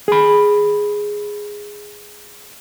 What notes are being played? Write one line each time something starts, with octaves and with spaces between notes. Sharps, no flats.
G#4 B5